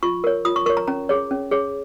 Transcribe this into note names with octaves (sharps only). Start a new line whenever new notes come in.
F4 C#6
A#4 C#5
F4 D#6
C#6
A#4 C#5 C#6
A#5
C#4 A#5
G#4 C#5
C#4
G#4 C#5